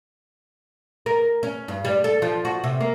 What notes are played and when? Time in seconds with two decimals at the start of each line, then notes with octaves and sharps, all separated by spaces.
1.06 A#4
1.43 C#4
1.68 G2
1.85 G3
2.04 A4
2.22 F3
2.45 F#4
2.64 C3
2.80 A#3